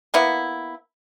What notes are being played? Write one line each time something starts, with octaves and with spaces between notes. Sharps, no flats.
A#3 B3 E4